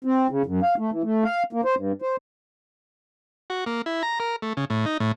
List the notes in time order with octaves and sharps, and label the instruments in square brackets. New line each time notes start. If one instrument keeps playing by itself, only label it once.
[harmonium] C4
C#3
F#2
F5
A3
E3
A3
F5
A#3
C5
G2
C5
[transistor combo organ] F#4
A#3
E4
A#5
A#4
A3
C#3
A2
D#4
A2